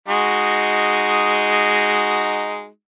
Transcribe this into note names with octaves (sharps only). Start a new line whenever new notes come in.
G#3 D#4 F#4